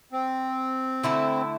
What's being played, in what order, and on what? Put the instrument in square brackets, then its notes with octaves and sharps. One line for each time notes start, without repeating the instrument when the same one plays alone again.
[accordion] C4
[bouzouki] D3 A3 E4 A4